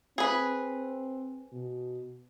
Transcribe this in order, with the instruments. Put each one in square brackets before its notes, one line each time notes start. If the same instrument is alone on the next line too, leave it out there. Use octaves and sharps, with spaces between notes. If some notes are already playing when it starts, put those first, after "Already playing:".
[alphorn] C4 [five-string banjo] G#4 B4
[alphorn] B2